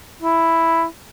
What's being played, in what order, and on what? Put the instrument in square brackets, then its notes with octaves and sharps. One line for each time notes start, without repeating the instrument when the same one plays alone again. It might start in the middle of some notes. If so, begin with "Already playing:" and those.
[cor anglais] E4